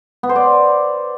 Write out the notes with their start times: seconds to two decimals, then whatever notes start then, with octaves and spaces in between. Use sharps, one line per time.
0.23 B3
0.29 C5
0.36 D5